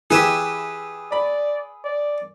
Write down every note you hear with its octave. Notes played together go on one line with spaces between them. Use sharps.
E3 G4 G#4 B4 E5
D5 B5
D5